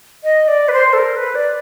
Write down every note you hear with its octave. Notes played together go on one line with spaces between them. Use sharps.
D#5
D5
B4
C5
A4
A#4
B4
D5